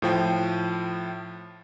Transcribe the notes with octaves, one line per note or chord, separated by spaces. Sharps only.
A2 F3 G5